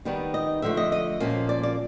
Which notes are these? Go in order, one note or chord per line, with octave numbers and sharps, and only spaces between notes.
D#3 G3 B3 D#4
D#5
D3 F3 A3 E5
D#5
D#5
A#2 F3 A#3 C#4
D5
D5